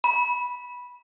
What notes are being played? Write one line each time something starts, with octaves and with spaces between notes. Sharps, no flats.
B5